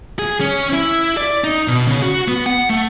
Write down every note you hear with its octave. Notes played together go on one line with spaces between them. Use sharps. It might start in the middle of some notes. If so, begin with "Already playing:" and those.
G#4
C#4
E4
D5
D#4
B2
C#3
F#4
B3
F#5
A3